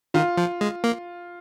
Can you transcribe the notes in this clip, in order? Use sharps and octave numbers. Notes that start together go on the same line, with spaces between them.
D#3 F4
F3
G#3
A#3